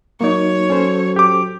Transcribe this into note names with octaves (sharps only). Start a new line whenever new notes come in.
F#3 A#3 D#4 C#5
C#4 A4 C5
G4 D6